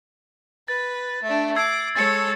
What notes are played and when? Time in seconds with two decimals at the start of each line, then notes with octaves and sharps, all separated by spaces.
0.68 B4 A6
1.24 A3 D4
1.56 D6 E6 G#6 C7
1.95 G#3 A4 C#5 A6 C#7